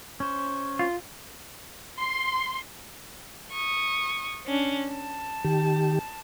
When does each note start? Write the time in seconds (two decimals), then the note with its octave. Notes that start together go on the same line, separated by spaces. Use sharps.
0.20 C#4 C5 C#6
0.79 F4
2.00 C6
3.52 C#6 D#6
4.46 C#4 D4
4.91 A5
5.45 D#3 G4